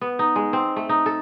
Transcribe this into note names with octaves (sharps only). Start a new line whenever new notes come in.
B3
D#4
G#3
C4
A3
D#4
A4